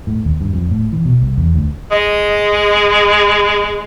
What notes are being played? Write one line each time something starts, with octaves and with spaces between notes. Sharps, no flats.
A2
D#2
G2
F2
A2
E3
B2
C2
E2
D2
G#3 D#5